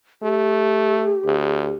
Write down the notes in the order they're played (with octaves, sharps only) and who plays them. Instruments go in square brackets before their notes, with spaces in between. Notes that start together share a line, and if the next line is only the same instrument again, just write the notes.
[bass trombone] A3 [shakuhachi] G4
[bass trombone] D2